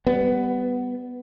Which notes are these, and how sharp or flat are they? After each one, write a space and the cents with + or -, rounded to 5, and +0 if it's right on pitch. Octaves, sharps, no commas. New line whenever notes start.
G3 +0 B3 +10